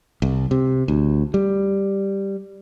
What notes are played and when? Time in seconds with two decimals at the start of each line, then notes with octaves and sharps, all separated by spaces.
0.22 C2
0.51 C3
0.88 D2
1.34 G3